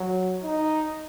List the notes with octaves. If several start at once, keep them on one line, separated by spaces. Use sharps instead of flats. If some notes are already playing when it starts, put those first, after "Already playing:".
Already playing: F#3
D#4